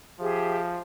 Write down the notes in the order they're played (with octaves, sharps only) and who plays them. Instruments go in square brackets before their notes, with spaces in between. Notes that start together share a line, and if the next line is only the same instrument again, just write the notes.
[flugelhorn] F3 [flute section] G4 G#4 E5